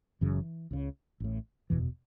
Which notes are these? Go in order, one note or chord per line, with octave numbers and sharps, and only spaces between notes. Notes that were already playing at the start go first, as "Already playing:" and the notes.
F#1 F#2 C#3 E3
C#2 C#3
A1 A2
F#1 E2 B2 E3